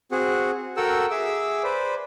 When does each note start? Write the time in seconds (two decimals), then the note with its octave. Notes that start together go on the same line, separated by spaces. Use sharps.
0.11 C4 F#4 G#4 F#5
0.77 F#4 A4 A#4 F#5 G5 E6
1.11 G#4 E5 D6 E6
1.63 B4 C5 D5